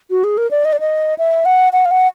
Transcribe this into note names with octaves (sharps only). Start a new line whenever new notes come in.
F#4
G#4
A#4
D5
D#5
D5
D#5
E5
F#5
F#5
F5
F#5